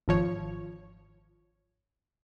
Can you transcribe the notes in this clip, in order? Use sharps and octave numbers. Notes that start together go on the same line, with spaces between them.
G#1 F3 C#5